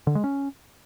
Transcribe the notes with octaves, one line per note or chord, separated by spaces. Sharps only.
D3
G#3
C#4